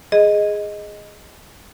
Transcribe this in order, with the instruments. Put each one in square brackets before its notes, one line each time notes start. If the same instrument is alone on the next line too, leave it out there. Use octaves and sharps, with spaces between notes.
[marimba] G#4 D#5